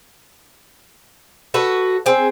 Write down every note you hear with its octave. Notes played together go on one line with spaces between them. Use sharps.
F#4 A4 B4
C4 G#4